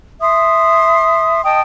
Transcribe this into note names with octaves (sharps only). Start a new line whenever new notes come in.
E5 C6 D#6
D#5 G5 A5 D#6